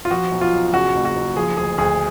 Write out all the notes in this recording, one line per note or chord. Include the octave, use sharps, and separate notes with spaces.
F4
F3 F#4
B1
F4
B1
C#3 F#4
F#1
F#4
F#1
F3 G#4
D2 G#4
D2 G#4